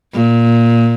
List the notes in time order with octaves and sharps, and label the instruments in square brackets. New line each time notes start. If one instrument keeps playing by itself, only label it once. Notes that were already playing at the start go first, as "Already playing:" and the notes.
[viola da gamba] A#2